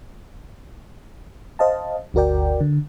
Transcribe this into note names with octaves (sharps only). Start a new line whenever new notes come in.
C5 D#5 F5 A5
G1 D2 F#4 A#4 D5 G5
D3